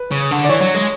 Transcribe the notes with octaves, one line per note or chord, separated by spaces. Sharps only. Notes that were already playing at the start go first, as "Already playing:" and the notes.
Already playing: B4
C#3
D3
D5
E3 C#5
F#3
G#3